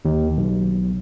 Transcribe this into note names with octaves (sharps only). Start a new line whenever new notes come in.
D#2
B1